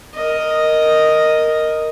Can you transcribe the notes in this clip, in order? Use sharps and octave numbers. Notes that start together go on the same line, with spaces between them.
A#4 D#5